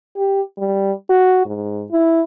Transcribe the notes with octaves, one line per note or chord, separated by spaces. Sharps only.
G4
G3
F#4
G#2
E4